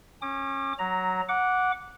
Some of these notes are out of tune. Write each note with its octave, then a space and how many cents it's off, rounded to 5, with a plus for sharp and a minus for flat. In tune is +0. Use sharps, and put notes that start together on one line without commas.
C#4 -25 D6 +30
F#3 +0 A#5 +0
F#5 -10 D6 -10